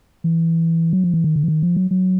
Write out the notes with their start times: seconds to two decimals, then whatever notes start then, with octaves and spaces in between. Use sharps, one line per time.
0.24 E3
0.93 F#3
1.04 F3
1.14 E3
1.24 D#3
1.36 D3
1.43 E3
1.48 D#3
1.63 F3
1.77 F#3
1.91 F#3